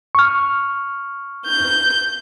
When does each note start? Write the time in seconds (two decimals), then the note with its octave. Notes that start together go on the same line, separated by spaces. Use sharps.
0.15 C#6 F6
1.45 G6